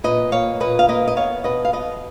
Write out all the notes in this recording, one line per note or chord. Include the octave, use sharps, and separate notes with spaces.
A#2 B4 D#5
A#3 C#5 F5
A#2 B4 D#5
F5
A#3 B4 D#5
D#5
B3 C#5 F5
B2 B4 D#5
F5
B2 B4 D#5